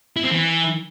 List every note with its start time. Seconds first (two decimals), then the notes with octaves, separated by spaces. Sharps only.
0.17 E4
0.24 C4
0.31 E3